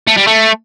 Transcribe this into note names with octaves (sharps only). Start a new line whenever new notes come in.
A3
G3
A3